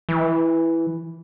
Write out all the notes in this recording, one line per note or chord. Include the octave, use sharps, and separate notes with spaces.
E3